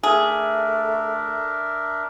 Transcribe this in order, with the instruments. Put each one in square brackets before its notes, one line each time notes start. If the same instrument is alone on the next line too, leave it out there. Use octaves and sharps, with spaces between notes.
[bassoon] A3 [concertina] D4 A#4 E5 [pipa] G#4